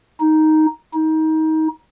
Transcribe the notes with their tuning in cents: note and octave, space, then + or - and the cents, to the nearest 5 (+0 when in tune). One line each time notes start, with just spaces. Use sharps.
D#4 +5
D#4 +25